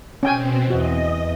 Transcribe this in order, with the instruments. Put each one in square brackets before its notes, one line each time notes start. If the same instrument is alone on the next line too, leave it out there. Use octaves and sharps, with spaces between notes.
[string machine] B2 C4 [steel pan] C#4 G5 G#5
[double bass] E2 [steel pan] F#4 [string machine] D#5